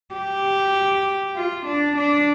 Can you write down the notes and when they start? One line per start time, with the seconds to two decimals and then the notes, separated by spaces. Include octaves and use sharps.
0.14 G4
1.36 F4
1.67 D4
1.97 D4